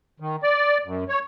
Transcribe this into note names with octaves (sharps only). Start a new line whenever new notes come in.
D#3
D5
F#2
C#5